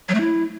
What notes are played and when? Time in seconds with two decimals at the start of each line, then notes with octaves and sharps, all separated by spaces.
0.09 F#3
0.15 A3
0.20 E4